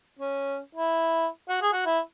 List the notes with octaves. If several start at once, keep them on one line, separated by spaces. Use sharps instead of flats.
C#4
E4
F#4
G#4
F#4
E4